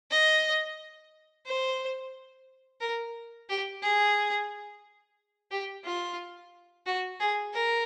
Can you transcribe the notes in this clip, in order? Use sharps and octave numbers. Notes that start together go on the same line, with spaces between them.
D#5
C5
A#4
G4
G#4
G4
F4
F#4
G#4
A#4